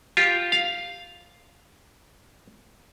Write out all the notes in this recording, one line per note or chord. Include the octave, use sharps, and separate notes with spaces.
F4 G4
F5